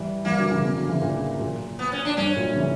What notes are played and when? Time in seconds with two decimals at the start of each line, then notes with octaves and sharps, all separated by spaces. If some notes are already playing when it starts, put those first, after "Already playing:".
Already playing: E3 G3
0.25 E3 G3 A#3
0.38 D3 F#3
0.51 C#3 E3
0.64 B2 D3
0.77 D3 F#3
0.89 C#3 E3
1.02 A#2 C#3
1.40 F#2 A#2
1.79 B3
1.92 C#4
2.05 D4
2.17 G2 C#4
2.36 F#2 A#2
2.56 C#3 E3